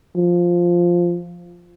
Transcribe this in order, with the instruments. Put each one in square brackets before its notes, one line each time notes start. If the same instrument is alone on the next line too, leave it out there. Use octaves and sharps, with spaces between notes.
[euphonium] F3